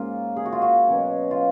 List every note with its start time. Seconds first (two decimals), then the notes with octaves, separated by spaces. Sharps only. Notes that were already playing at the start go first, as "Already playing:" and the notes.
Already playing: G#2 A#3 C#4 F4 A#4
0.36 G#4
0.45 F#4
0.52 F4
0.62 F#4
0.88 B2 F#3 C#4
1.31 F4